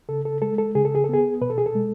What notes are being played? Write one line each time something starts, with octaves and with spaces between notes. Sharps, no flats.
C#3 A4
A4
G#3 A4
A4
C#3 G#4
A4
G#4
A4
B3 G#4
B2 B4
A4
G#4
A4
G#3